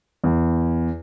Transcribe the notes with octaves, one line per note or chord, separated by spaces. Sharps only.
E2